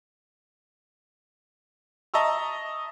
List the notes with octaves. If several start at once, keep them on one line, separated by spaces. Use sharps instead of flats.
D#5 E5 A5 A#5 C#6 E6